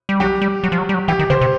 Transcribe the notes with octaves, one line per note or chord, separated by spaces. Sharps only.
G3
F#3 G4
G3
F#3
F3
F#3
G3
F#3
E3 G4
D#3
C#3 C5
C3